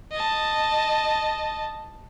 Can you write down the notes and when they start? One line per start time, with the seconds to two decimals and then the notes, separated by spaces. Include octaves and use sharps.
0.12 D#5 A5